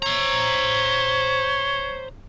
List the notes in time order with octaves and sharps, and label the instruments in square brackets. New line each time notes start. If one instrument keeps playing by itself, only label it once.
[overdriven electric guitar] C5 A#5 [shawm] C#5